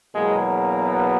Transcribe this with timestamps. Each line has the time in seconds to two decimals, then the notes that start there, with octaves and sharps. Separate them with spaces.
0.15 E2 B2 F#3 G#3 A#3 G#4
0.88 B3 B4